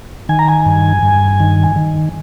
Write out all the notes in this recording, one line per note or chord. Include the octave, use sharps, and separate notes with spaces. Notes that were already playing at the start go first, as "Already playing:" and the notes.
D#3 G#5
A#5
G#5
G2
G2
D#3
D#3